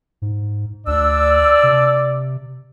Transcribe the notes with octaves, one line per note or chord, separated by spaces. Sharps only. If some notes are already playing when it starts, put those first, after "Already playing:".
G#2
D2 D4 D5 E6
C3